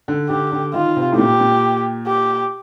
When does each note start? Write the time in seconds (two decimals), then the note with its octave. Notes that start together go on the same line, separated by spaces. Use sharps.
0.08 D3
0.30 D3 G4
0.52 D3
0.74 D#3 F4
0.96 C3
1.12 A2
1.18 A#2 G4
1.40 A#2
2.07 G4